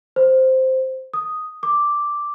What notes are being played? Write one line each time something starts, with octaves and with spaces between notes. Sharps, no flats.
C5
D#6
D6